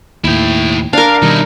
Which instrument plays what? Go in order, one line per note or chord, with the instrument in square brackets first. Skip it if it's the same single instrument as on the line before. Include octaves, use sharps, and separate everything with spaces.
[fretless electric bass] D#2 A2 [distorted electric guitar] E4 G5
[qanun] D4 A#4 [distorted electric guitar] F5
[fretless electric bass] B2 D#3 G3 [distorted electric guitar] D#4 E4